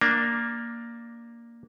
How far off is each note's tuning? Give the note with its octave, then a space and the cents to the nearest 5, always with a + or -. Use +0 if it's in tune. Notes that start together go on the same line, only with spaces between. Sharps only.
A#3 +0 D4 +5